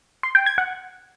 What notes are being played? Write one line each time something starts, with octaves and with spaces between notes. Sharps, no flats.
C6
G5
G#6
F#5